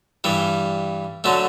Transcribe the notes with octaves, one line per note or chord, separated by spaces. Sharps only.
G2 E3 G3
D3 F#3 A3